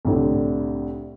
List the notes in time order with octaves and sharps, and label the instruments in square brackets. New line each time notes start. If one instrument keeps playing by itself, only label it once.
[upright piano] C2 A2 D3